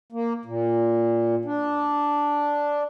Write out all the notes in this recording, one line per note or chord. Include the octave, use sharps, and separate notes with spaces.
A#3
A#2
D4